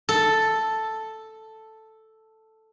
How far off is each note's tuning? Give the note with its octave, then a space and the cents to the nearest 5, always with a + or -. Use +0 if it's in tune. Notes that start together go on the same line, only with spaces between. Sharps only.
A4 +0